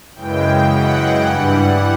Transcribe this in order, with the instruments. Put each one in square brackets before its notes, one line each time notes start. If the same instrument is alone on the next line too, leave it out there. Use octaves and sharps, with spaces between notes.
[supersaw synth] F#2 C#3 E3 G#3 G5
F#5
G2 E3 G3